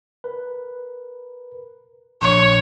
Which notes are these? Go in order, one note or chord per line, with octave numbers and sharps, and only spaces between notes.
A#4 B4
A#1 C#5